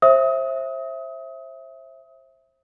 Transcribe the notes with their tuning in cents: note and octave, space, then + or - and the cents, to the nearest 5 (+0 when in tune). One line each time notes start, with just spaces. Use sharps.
C5 +30 E5 +0 D#6 +30